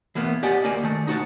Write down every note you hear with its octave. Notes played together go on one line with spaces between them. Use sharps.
E3 A#3 B3
G4 D5 D#5 F#5 G#5 A5
D2 A#3 D5 G#5
D#3 A3
D#4 F#4 A5